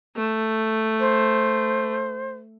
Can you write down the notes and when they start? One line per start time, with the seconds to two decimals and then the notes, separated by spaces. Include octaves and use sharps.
0.16 A3
1.00 C5